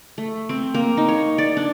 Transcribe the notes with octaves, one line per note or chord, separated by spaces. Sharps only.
A3
C4
A#3
D#4
C#5
D5
D4